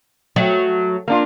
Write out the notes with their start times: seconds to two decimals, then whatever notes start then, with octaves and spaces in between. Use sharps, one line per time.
0.36 F#3 A3
1.08 A#3 D4 F4